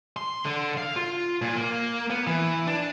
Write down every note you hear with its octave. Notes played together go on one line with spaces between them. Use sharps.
C6
D3
F5
F4
A#2
A#3
B3
E3
D4